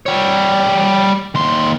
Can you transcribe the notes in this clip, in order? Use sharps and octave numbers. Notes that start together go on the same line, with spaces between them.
G3 C#5
D#2 C6